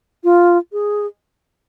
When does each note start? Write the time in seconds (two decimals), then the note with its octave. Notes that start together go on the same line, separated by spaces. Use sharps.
0.24 F4
0.72 G#4